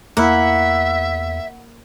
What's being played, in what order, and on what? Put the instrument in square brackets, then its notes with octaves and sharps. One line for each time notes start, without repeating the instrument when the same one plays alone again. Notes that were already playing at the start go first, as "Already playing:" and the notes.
[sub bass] E2 [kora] A#3 E4 [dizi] E5 [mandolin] F#5